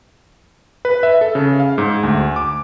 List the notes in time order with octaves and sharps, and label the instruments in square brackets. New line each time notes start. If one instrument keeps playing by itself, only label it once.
[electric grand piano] B4
E5
A4
C#3
F5
G#2
D2
D6